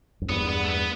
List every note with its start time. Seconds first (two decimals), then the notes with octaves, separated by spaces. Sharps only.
0.22 F#2
0.29 E2 G2 B3
0.49 B3
0.64 A3
0.69 B3